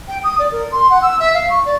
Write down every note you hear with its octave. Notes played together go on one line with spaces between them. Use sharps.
G5
D#6
D5
A#4
C6
F#5
E6
E5
F5
C#6
D5